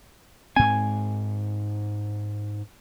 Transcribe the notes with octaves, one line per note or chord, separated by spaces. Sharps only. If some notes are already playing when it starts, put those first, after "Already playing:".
G#2 C4 G#5